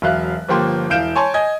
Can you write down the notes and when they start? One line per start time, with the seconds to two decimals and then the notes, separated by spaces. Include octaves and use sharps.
0.02 E1 F#3 E5 F5 F#6
0.49 G1 F3 A#3 G4 C6
0.90 E1 E4 F5 G6 D7 E7
1.15 C#5 G#5 A5 C6
1.34 D#5 G#5 G#6